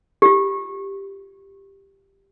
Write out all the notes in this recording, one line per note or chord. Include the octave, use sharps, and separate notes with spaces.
F4 G4